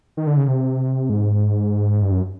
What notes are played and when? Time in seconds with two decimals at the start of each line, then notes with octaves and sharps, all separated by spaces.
0.17 D#3
0.27 D3
0.37 C#3
0.47 C3
1.09 G#2
2.02 G2
2.12 F#2